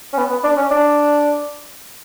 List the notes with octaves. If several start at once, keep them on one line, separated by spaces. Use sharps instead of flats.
C#4
B3
B3
D4
C#4
D4